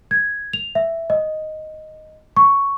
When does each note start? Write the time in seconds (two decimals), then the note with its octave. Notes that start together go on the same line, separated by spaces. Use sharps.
0.11 G#6
0.53 F7
0.75 E5
1.10 D#5
2.37 C#6